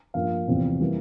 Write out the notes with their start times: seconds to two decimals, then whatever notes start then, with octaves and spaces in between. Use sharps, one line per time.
0.14 G2 F3 A#3 F5
0.48 E1 E2 C3 F3 C4
0.80 E3 G3 A#3